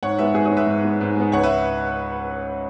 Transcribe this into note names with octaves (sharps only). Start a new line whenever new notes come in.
G#2 C#5 F#5
G#3 B3 B4 E5
G#2 G#4
G#4 C#5
G#3 B3
B4 E5
G#2
G#3 B3
G#2
G#3 B3
C#2 C#5 F#5
B4 E5